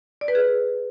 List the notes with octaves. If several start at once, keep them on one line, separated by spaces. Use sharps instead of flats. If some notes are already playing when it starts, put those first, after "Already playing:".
D5
B4
G#4